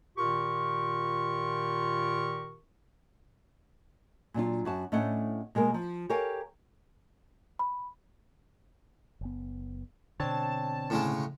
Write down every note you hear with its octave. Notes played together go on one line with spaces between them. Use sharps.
A#2 D#3 F4 G4 A#4 C#6
A#2 F#3 D4 F4
F#2 F#4 A5
A2 A3 C#4 D4 D#5 F#5
B2 G#3 A#3 A#4
F3
G4 A4 A#4 C#5 F5 G#5
B5
F#1 B3
B2 D3 C4 D4 C#5 A5
A2 C#3 G#3